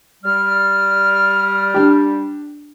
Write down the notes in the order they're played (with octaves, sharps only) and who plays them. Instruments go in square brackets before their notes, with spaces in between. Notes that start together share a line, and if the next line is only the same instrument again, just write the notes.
[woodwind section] G3 [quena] F6
[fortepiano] D4 G4